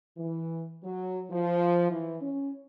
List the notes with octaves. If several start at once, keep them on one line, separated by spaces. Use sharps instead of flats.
E3
F#3
F3
E3
C#4